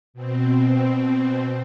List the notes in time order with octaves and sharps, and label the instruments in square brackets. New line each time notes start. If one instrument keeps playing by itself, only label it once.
[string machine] B2 C4